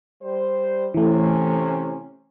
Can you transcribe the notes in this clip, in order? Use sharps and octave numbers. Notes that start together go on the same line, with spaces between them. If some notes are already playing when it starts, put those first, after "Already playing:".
G3 C5
A2 C3 E3 A3 C#4